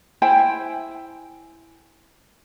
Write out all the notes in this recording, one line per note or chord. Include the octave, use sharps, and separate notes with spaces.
E4 C5 G5 G#5